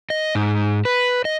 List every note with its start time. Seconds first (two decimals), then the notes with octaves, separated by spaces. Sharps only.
0.10 D#5
0.35 G#2
0.85 B4
1.25 D#5